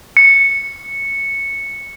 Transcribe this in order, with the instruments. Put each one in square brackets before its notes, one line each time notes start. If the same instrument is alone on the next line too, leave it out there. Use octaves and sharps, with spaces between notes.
[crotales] C#7